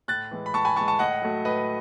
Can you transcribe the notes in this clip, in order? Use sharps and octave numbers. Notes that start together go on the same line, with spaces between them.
A2 F#6 A6
E3 G#3
B5
A2 A5 C#6
G#5 B5
E3 G#3 A5 C#6
A5 C#6
A2 D#5 F#5
F#3 A3
A2 B4 D#5